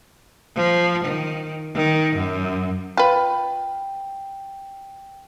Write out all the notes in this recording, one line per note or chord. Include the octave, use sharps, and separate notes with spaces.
F3
D#3
D#3
F#2
F4 B4 G5